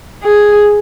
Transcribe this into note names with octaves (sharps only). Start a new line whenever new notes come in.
G#4